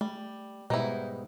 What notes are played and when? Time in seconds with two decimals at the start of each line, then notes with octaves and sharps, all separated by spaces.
0.01 G3 A3
0.70 G#2 B2 G3 B3 D#4 E4